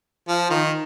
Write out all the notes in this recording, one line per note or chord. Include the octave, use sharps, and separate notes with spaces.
F3
D#3